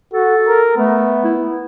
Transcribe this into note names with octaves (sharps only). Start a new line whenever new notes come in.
F#4 A4
A#4
A3 B3
E4